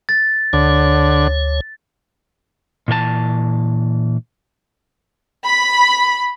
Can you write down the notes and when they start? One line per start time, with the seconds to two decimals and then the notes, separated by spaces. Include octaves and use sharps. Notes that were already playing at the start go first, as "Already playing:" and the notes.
0.09 A6
0.53 D2 D3 C#5
2.88 A#2 E3 A#4 A5
5.43 B5